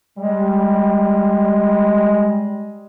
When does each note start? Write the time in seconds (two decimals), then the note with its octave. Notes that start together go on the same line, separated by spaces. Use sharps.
0.18 G3 G#3